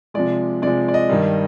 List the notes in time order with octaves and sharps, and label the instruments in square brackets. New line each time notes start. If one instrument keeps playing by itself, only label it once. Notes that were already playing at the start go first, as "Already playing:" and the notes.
[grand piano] C3 F3 G#3 D5
C3 F3 G#3 D5
D5
D#5
G2 D#3 G3